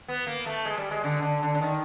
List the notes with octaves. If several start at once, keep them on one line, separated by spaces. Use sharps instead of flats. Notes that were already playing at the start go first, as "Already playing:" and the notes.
B3
A#3
A3
G#3
G3
G#3
D3
D3
D3
D3
D#3